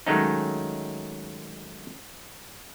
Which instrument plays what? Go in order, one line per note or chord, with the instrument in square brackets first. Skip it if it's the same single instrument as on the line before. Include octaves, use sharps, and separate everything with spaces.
[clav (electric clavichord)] D#3 F#3 G#3 A3 C#4 D#4